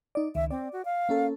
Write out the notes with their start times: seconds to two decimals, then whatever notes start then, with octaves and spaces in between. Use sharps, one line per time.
0.15 D#4 D5
0.35 C#2 D#3 E5
0.51 C4 D5
0.72 F#4
0.85 F5
1.09 A#3 C#4 A4